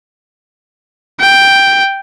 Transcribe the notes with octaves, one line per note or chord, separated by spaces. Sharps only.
G5